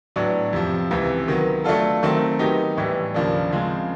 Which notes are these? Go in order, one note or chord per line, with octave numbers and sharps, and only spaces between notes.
A2 F#3 B3 D4
F2 C3 F3
C#2 C3 E3
D#3 F#3 B3
F#3 A3 D4 F4 A4
D#3 F#3 A3 C4
D#3 F#3 B3 D#4 G4
A2 E3 G3
D#2 C#3 F3 A#3 D4
C#3 F3 G#3 C4